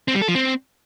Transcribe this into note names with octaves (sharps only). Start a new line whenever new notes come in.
C4
G3
A4
F3
C4